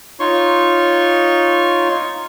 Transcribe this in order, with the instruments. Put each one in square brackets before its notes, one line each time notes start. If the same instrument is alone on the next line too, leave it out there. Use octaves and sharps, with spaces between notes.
[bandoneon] D#4 F4 C#5 C6 C#6